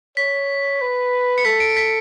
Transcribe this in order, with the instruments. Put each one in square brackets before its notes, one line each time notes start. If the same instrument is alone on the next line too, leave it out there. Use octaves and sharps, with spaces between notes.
[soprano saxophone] C#5 [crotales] B6
[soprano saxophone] B4
[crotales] C#7
[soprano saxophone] A4 [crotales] B6
[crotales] D7
B6